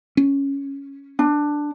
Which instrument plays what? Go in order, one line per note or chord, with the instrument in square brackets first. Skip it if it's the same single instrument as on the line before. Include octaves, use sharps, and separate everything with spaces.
[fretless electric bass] C#4
[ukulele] D4